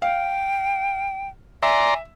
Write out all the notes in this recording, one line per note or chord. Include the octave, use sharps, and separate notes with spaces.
F5 G5
D5 E5 G#5 A#5 C6